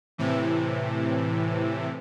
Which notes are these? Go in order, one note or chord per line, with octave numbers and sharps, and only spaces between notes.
A2 C3 E3